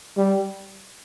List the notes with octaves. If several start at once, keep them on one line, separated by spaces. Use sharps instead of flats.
G3